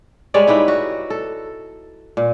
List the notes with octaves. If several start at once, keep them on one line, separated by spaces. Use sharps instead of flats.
G3 G#3 C#5 D5
D#4 E4 G4 B4
F#4
A4
A#2